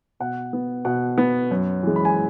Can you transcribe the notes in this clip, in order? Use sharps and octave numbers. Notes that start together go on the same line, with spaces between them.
B2 F#5
B3
B2 F#5
B3
F#2
E3 G#3
B5
G#5